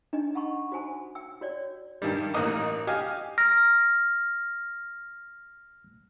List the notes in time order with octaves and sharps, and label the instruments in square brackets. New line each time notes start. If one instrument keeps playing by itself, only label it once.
[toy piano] D4 D#4 D#5
F#5 A5 B5 C#6
F#4 C5 G#5 A5
G5 E6
F#4 C#5 D5
[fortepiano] G2 D#3 G3
A1 A#3 D#4 D#5 D6
G4 D#5 F5 G#5
[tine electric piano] F6 A#6